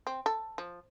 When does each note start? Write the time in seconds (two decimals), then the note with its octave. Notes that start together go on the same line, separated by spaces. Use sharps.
0.07 C4
0.26 A4
0.58 F3